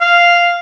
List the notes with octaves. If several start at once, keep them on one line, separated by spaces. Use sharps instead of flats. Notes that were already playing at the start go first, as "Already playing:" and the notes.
F5